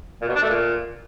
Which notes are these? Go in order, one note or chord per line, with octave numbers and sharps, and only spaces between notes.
A#2
B2
D4
A3
A#2